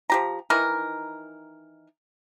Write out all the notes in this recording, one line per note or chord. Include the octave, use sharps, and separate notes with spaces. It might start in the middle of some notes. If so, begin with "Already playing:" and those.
F3 G4 A#5
D#3 E3 D#4 A#4